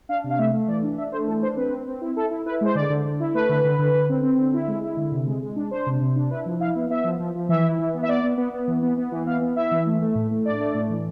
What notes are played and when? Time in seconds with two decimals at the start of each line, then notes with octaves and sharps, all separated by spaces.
0.09 D4 F5
0.24 C3
0.30 F5
0.38 A3 E5
0.53 A3
0.68 E3 D5
0.83 D4
0.98 D4 E5
1.12 A3 C5
1.27 E3 A4
1.42 D4 C5
1.57 C4 B4
1.72 C4
1.87 C4
2.01 E4
2.16 E4 A4
2.31 E4
2.46 E4 B4
2.61 G#3 C5
2.75 D3 D5
2.90 D3
3.05 D3
3.20 E4
3.34 A3 B4
3.49 D3
3.64 D3
3.79 D3
3.94 D3
4.09 C4
4.23 C4
4.38 D3
4.54 E4
4.68 G#3
4.83 E4
4.97 D3
5.12 C3
5.27 G#3
5.42 G#3
5.56 D4
5.71 D4 C5
5.87 C3
6.01 C3
6.16 D4
6.31 E4 B4
6.46 F3
6.60 E4 F5
6.75 B3
6.90 B3 E5
7.04 F3
7.20 F3
7.35 F3
7.49 E3 E5
7.64 E4
7.79 E3
7.94 B3
8.03 E5
8.09 B3 D5
8.23 B3
8.38 B3
8.53 B3
8.68 E3
8.82 B3
8.98 B3
9.12 E3
9.26 B3 F5
9.41 B3
9.56 E4 E5
9.72 E3
9.86 A3
10.02 A3
10.15 A2
10.31 A3
10.45 D4 D5
10.60 A3
10.74 A2
10.90 E3